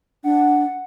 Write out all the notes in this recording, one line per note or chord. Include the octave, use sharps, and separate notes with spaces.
D4 F#5